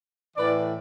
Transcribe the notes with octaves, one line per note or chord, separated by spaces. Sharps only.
A2 E3 B4 D5